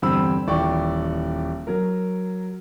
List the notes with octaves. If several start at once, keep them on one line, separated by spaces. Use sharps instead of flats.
E2 G2 D3 C4 B5 E6
D#1 E3 D5 G5 C#6
F#3 A#4